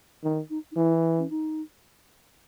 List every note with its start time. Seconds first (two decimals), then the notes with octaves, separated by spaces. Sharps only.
0.23 D#3 D#4
0.50 D#4
0.71 D#4
0.76 E3 E4
1.18 C#4
1.30 D#4